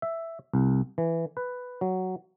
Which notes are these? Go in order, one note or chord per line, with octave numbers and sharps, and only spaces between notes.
E5
C2
E3
B4
F#3